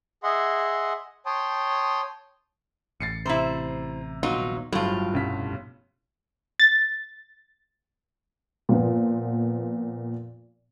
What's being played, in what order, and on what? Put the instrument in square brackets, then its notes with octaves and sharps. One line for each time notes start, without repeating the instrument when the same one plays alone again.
[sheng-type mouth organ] G#4 D#5 E5 F#5 C6
C#5 G5 A5 C6 D#6
[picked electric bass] A1 [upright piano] A6 C7 C#7
[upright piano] C3 A#5 [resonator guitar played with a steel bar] E4 C5
[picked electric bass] D#1 A#1 B3 [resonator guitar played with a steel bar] F#3 D#4 F4
[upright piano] G1 F3 [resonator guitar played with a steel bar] A2 F4 [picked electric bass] F#3
[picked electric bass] F1 B2 C#4 [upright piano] C2 G2 B6
[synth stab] A6
[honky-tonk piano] A#2 F3 B3